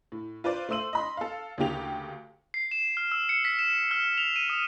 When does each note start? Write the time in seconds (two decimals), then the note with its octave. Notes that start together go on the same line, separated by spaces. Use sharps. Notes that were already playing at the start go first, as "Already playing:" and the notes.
0.12 A2
0.44 F4 B4 C5 D5
0.69 A3 C5 C6 E6 D#7 F#7
0.93 D#5 B5 C6
1.17 A4 F5
1.58 D2 C#3 A#3 G4 F7
2.54 C7
2.71 E7
2.97 F6
3.12 E6
3.29 C#7
3.45 B6
3.59 E7
3.91 F6
4.18 F7
4.36 D#7
4.50 D#6